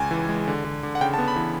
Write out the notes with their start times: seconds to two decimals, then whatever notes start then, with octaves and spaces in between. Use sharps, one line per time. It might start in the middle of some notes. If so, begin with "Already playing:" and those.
Already playing: C#2 G#5
0.11 E3
0.29 G#3
0.48 D3
0.64 D3
0.83 D3
0.95 F#5
1.01 C#3 G5
1.14 A5
1.18 B3
1.28 B5
1.36 E3